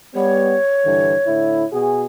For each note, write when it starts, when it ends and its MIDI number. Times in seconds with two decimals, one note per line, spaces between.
0.15 0.57 55
0.15 0.57 59
0.15 1.64 73
0.85 1.14 43
0.85 1.14 50
0.85 1.14 52
1.27 1.64 45
1.27 1.64 50
1.27 1.64 64
1.73 2.06 47
1.73 2.06 66
1.73 2.06 68